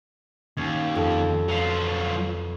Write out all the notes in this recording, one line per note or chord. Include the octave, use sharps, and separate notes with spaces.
D#2 C#4
F2
F#3 F4 B4 C6